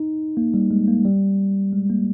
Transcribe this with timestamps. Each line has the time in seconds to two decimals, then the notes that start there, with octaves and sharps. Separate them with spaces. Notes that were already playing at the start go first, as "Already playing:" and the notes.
Already playing: D#4
0.37 A#3
0.54 G3
0.71 G#3
0.88 A#3
1.05 G3
1.73 G#3
1.90 A#3